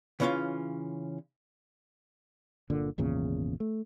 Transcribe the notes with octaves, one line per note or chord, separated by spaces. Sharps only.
C#3 E3 C#4 D#4 F4 F5
G1 A#2 D3
G#1 E2 A#2 C#3
A3